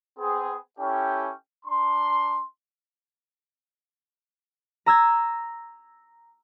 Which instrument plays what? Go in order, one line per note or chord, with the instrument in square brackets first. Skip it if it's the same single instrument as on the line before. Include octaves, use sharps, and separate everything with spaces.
[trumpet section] B3 C4 G#4
C#4 E4 G4 A4 G5
D4 A#5 C6
[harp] A#5 E6 G#6